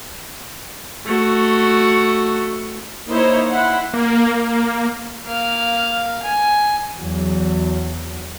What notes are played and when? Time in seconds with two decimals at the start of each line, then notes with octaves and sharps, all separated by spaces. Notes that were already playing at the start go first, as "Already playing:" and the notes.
1.05 A3 F#4
3.08 A#3 D#4 E4 C5 C#5
3.49 E4 F#5 B5 C6
3.94 A#3
5.26 A#3 F5
6.23 G#5
6.94 E2 F#3